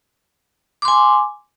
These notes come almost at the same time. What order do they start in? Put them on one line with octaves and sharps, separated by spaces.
D6 C6 G#5